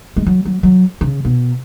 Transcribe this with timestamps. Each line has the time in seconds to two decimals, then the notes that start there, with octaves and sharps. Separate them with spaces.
0.16 G#3
0.27 F#3
0.45 F#3
0.63 F#3
1.01 C#3
1.25 B2